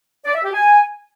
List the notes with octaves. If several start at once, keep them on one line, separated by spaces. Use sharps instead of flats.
D5
E5
G4
G#5